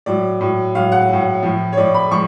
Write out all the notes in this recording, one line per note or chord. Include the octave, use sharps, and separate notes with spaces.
A2 F#3 D5
A2 F#3
A2 F#3 F5
F#5
A2 F#3
A2 F3
C#5
A2 F3 D5
B5
F3 C#6